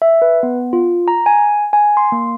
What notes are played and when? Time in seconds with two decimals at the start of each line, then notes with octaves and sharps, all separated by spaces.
0.02 E5
0.22 B4
0.43 B3
0.73 F4
1.08 A#5
1.26 G#5
1.73 G#5
1.97 C6
2.12 A#3